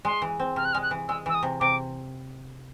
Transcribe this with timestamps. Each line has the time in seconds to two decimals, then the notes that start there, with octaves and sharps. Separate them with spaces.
0.05 G#3 C6
0.22 E3
0.39 C4
0.56 C3 F6
0.65 F#6
0.73 G#3 F6
0.83 F#6
0.91 E3
1.08 G#3 E6
1.26 E3 E6
1.35 D#6
1.43 C3
1.60 C3 D6